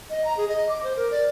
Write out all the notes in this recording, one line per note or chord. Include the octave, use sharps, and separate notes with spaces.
D#5
A#5
G#4
D#5
D6
C5
A#4
D5